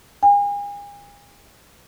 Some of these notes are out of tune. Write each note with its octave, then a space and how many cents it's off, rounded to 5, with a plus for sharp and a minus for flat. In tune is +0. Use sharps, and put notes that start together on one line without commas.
G#5 -40